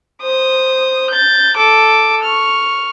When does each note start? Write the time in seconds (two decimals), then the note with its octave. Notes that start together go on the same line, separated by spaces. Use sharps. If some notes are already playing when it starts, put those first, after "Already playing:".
0.23 C5 D#6
1.11 G6 A6
1.57 A4 D6
2.23 C#6 F6